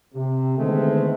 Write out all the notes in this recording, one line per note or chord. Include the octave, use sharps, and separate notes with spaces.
C3
D3 D#3 G#3 A3 B3 C4